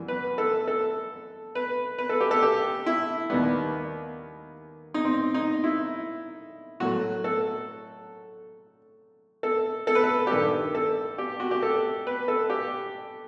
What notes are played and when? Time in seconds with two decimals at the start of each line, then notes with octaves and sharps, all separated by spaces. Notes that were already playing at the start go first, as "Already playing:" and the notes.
Already playing: F#2 E3 G3
0.08 B4
0.38 A4
0.68 A4
1.55 B4
1.98 B4
2.09 A4
2.20 G4
2.31 A4
2.42 G4
2.86 E4
3.30 D#2 D#3 G3 B3
4.94 D#4
5.05 C4
5.34 D#4
5.64 E4
6.80 A2 F#3 A3 F#4
7.24 A4
9.43 A4
9.87 A4
9.95 B4
10.04 A4
10.27 G4
10.31 G2 D#3 G3 A4
10.75 A4
11.18 G4
11.40 F#4
11.51 G4
11.62 A4
12.07 B4
12.28 A4
12.50 G4